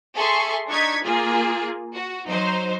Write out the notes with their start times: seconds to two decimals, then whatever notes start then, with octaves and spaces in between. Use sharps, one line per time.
0.16 G#4 A4 E5 C6 C#6
0.68 D4 D#4 C#6 G#6 B6
1.03 A#3 F4 G#4
1.94 F#4
2.28 F#3 D#4 C5